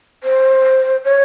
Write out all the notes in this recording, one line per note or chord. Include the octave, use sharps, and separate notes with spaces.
C5
C#5